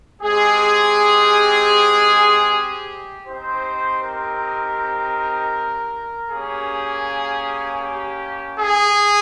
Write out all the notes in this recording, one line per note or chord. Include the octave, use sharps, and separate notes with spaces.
G#3 C4 G4 G#4
G4
C4 D#4 G4 C5
A#4
A#3 C#4 G4 G#4
G4
G#4